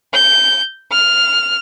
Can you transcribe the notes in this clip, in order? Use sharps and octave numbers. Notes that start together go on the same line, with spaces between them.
G6
F6